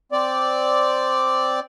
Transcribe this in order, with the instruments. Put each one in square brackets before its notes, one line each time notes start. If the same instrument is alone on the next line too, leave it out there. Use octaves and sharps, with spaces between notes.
[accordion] C4 D5